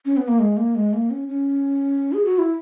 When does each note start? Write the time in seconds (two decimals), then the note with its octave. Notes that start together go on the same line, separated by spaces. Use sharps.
0.06 C#4
0.17 B3
0.28 A#3
0.39 G#3
0.57 A#3
0.75 G#3
0.93 A#3
1.10 C#4
1.28 C#4
2.13 G#4
2.25 F#4
2.38 E4